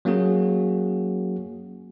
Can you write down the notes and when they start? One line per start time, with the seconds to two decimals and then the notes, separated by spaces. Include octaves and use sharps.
0.05 F#3 A#3 C#4 F#4 G#4